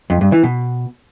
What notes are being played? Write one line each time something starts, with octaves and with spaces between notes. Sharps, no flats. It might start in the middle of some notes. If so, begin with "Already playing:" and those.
F2
G2
E3
B2